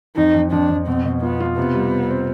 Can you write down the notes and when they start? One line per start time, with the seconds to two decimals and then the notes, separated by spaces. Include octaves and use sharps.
0.16 F2 D#4
0.34 F2
0.52 F2 D4
0.70 F2
0.88 B2 C4
1.05 B2
1.22 B3 F4
1.40 F4
1.57 C3 B3
1.74 G3
1.92 C4
2.10 C4